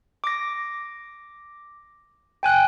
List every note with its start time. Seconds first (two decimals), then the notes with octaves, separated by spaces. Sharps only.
0.24 D6 A#6
2.43 G5 G#5 F#6